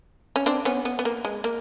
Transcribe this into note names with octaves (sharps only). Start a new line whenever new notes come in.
C#4
C4 D4
B3 C#4
B3
B3
A#3
G#3
A#3